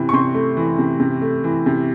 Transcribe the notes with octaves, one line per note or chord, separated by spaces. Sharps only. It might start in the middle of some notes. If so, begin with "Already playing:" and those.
Already playing: C3 E3
C#6
C3 C6
A3
E3
C3
C3
A3
E3
C3